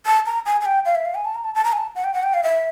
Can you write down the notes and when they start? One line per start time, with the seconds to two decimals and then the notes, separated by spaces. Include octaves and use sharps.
0.06 A5
0.26 A#5
0.46 G#5
0.61 G#5
0.65 G5
0.85 F5
0.95 E5
1.05 F5
1.15 G#5
1.25 A5
1.35 A#5
1.44 A5
1.55 A5
1.64 A#5
1.72 G#5
1.77 A5
1.95 F#5
2.04 G5
2.14 F#5
2.23 G5
2.33 F5
2.43 E5